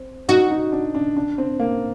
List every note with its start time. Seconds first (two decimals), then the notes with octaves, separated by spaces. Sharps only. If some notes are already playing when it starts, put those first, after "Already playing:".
Already playing: C4
0.28 D#4 F#4
0.51 D#4
0.72 D4
0.95 D4
1.17 D4
1.38 C4
1.60 A#3